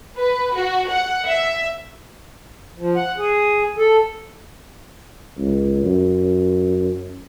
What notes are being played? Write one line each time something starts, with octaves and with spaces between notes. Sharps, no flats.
B4
F#4
F#5
E5
F3
F#5
G#4
A4
C#2
F#2